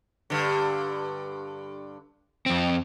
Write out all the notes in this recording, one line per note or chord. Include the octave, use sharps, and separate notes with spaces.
G2 D3
F2 C4